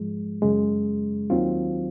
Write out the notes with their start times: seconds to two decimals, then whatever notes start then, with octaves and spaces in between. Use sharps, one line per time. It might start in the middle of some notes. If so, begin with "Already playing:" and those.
Already playing: G#2 F3 G#3
0.42 F#2 C#3 G#3
1.30 D#2 D#3 F#3 C4 F4